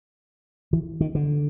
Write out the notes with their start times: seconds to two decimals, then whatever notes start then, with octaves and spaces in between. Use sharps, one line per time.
0.73 E3
1.01 D#3
1.15 D3